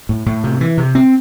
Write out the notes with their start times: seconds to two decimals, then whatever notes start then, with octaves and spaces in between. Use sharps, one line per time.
0.09 A2
0.26 A2
0.44 C3
0.61 E3
0.78 C3
0.95 C4